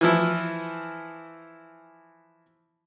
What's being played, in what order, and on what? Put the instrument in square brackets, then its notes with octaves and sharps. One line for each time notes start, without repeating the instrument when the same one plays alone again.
[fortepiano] E3 F3 E4